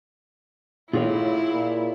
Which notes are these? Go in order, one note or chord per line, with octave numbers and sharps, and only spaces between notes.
A#1 A2 D#3 E4 F4 G#4 C#5
A#2